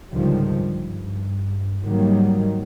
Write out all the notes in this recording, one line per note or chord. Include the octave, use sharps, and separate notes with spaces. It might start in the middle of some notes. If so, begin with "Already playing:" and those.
C#2 G#2 D3 D#3 F3 G3
G2
G#2 D#3 F#3 G3 A#3